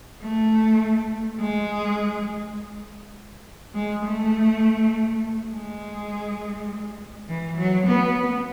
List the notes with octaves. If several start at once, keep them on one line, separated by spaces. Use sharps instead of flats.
A3
G#3
G#3
A3
G#3
E3
F#3
B3